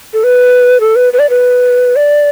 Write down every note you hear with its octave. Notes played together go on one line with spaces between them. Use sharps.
A4
B4
A4
B4
B4
D5
B4
D5